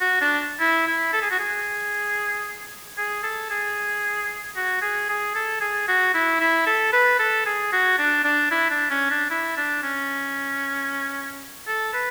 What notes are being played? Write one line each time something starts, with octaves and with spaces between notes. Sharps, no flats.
F#4
D4
E4
E4
A4
G#4
F#4
G#4
G#4
A4
G#4
F#4
G#4
G#4
A4
G#4
F#4
E4
E4
A4
B4
A4
G#4
F#4
D4
D4
E4
D4
C#4
D4
E4
D4
C#4
A4
B4